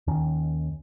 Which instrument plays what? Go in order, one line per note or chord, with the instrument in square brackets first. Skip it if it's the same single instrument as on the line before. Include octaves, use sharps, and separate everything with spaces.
[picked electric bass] D#2 D#3 C#4